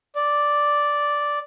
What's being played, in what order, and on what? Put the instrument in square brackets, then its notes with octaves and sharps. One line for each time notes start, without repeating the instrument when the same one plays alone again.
[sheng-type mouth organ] D5